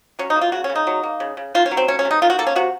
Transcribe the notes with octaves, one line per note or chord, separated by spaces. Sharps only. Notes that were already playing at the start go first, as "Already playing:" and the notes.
F#3 C#4
D#4
A#3
F4
C#3 F#4
C#4
C#3
D#4
F#3
A#3
C#3
C#3
D#3 F4
C#4
F#3
C4
A3 C#4
C#4
C3
D#4
D#3 F4
F#4
A#3 A4
C#4
C3 F#4